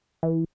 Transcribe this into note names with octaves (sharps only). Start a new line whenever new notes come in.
E3